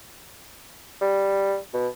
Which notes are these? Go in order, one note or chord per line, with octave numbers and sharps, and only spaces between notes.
G3
B2